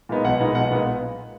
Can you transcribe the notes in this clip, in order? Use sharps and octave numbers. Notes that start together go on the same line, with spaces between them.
A#2 G#3 B3 D#4
B1 F#5
A#2 G#3 B3 D#4
B1 F#5
A#2 G#3 B3 D#4